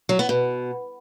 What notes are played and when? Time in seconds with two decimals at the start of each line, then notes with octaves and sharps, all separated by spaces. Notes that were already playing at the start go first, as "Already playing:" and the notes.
0.09 F#3
0.19 B3
0.29 B2